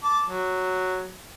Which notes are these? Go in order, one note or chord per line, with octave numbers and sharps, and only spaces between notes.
A5 D6
F#3